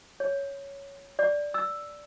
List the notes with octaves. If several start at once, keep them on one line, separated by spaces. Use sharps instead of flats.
C#5
D5
E6